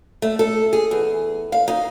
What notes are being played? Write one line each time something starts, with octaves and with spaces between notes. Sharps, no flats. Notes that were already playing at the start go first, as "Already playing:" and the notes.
A3
A4
G#4
E2
F5
D#4